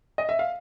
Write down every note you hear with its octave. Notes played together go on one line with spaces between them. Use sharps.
D#5
E5
F5